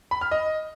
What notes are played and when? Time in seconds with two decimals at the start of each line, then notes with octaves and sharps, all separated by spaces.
0.11 B5
0.21 F6
0.31 D#5